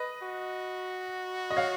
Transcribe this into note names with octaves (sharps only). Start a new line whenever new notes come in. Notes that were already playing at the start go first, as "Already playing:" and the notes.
Already playing: B4 D#5
F#4
D#5
C#5 F5